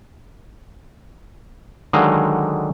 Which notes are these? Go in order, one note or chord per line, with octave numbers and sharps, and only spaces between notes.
D3 D#3 F#3 G#3 D#5 F5